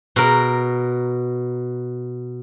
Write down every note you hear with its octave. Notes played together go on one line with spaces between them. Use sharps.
B2 A#4